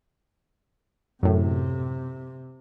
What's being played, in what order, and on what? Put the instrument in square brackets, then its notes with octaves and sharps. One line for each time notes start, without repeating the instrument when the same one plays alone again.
[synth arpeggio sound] F#2 A2 [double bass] C3